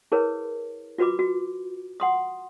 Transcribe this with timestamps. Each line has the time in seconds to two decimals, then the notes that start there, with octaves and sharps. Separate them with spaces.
0.12 E4 G#4 A#4 B4 C#5
0.98 F4 F#4 B4 B5 D6
1.19 F#4
2.00 F#5 C6 D#6